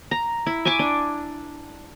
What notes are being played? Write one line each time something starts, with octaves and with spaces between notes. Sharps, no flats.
A#5
E4
E5 G#5 C#6 D6
D4